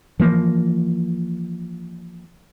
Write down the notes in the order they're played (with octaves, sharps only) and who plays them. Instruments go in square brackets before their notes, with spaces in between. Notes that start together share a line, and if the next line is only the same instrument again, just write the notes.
[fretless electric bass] E3 F3 A#3